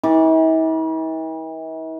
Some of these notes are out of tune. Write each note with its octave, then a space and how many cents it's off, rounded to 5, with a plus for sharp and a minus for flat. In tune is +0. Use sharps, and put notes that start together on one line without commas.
E3 -45 D6 +0